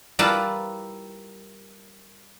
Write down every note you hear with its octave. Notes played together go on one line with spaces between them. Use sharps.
G3 A#3 E4 F4 B4 A5